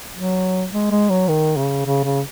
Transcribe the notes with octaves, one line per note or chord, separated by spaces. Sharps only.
F#3
G#3
G#3
F#3
D#3
C#3
C#3
C#3